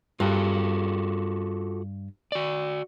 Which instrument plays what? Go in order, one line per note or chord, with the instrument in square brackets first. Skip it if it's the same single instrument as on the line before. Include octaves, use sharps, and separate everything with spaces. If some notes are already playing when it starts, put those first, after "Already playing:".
[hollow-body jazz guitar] G2 [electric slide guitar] F4 F#4 A4
[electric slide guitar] F#4 D5